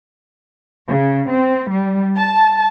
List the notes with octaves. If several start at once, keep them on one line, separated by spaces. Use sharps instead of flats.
C#3
C4
G3
A5